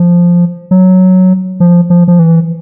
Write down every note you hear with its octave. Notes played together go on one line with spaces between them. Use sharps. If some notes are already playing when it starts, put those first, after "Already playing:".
Already playing: F3
F#3
F3
F3
F3
E3